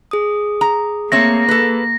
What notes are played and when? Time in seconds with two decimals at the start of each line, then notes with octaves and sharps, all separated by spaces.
0.11 G#4 D#6
0.61 A#5
1.12 A3 A#3 C4 C#5 A#6
1.49 A4 B4